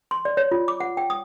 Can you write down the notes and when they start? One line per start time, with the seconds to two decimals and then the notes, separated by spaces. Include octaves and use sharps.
0.11 C6
0.25 D5
0.37 C#5
0.51 F4
0.68 D6
0.80 F#5
0.97 G5
1.10 D#6